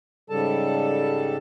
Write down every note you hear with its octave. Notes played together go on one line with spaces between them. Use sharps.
G#2 C#3 G3 A4 A5